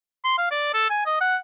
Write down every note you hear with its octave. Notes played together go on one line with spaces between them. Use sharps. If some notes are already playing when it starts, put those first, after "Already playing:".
C6
F5
D5
A4
G#5
D#5
F#5